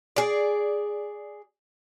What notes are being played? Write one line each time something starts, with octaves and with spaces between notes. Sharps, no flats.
G#4 D5